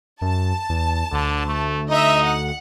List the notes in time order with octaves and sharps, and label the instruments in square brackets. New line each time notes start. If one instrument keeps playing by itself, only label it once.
[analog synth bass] F#2 [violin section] A5
[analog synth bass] E2
[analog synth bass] D2 [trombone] D3
[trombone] A3
[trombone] D#4 [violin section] D#5 E5
[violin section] F#5